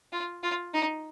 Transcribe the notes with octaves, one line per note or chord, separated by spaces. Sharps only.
F4
F4
D#4